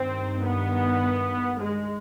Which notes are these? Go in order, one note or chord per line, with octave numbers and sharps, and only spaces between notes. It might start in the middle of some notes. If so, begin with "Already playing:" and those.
Already playing: G2 D#3 C4
B3
G#3